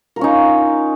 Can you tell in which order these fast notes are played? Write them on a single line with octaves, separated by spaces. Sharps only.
A#4 F4 C#4 D#4